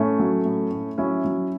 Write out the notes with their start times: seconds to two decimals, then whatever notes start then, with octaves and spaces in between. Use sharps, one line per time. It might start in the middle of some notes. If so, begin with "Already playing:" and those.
Already playing: A2 A3 C#4
0.19 F#3
0.46 A2
0.71 A2
0.98 F#3 C#4 E4
1.25 F#3